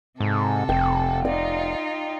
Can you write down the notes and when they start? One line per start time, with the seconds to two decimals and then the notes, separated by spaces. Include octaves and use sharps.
0.20 G#2 C3 A4
0.69 F1 G5
1.25 D#4 F4 D5